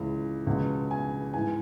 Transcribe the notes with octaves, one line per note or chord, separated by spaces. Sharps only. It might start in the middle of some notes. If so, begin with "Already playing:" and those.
Already playing: C#2 C#3 E3
C#2 B2
G#5
G#2 E3 G#5